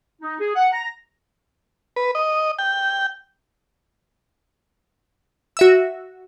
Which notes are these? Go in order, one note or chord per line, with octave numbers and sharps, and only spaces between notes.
D#4
G#4
F#5
A#5
B4
D#5
G5
F#4 E5 E6